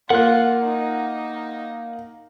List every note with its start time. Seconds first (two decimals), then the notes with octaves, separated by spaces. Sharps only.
0.10 A#3 F4 F#5 F#6
0.63 D#4